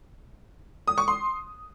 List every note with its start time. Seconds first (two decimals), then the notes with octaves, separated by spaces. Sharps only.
0.88 D#6
0.98 C#6
1.08 C6